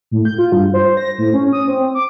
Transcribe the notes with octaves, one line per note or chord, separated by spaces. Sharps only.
A2
G6
F4
G2
C5
A#6
A2
C#4
D#6
C4
D6